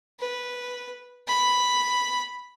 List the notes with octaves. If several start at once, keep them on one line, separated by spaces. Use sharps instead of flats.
B4
B5